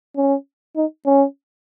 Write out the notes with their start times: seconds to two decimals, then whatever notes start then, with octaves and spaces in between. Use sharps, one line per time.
0.17 C#4
0.76 D#4
1.06 C#4